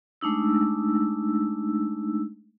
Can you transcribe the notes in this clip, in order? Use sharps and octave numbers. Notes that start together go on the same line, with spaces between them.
G#3 A3 D4 D#4 E6